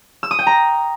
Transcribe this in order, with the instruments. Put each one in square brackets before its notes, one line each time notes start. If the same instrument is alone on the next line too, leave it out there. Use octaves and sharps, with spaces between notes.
[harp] E6
D#6
G5
A#5